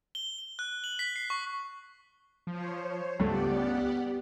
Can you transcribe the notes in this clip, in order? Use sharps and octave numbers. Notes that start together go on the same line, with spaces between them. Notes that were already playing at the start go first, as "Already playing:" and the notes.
G7
G7
F#6
F#7
B6
C7
C#6
F3 C5 C#5
C#2 G2 G3 A3 B3 G4 D5 F#5